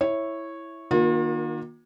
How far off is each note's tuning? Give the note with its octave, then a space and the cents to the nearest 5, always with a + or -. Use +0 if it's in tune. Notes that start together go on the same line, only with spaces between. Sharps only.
E4 +0 C#5 -10 E5 -5
D#3 -5 A#3 +30 F4 +45